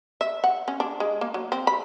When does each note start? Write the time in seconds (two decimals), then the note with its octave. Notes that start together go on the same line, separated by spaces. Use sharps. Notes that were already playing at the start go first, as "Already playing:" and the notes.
0.21 E5
0.44 F#5
0.68 C#4
0.80 D4
1.00 G#3
1.21 A#3
1.34 F#3
1.52 C4
1.67 B5